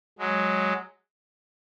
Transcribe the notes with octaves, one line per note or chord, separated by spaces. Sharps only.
F#3 G#3